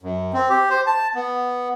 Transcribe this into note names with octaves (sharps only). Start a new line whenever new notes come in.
F#2
C4
G4
C5
A5
B3